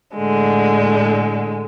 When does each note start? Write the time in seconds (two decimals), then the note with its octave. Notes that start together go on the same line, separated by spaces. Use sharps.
0.15 A2 D3 G#3